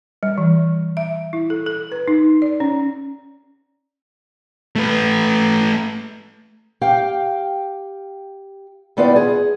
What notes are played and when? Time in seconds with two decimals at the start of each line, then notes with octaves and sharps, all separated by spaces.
0.23 G3
0.38 E3
0.97 E5
1.33 E4
1.50 A4
1.66 A4
1.92 B4
2.08 D#4
2.42 D5
2.60 C#4
4.76 A3 B4
6.81 G4 F5 G5
8.97 D#3 G3 B3 E4 F4 D5
9.16 G#4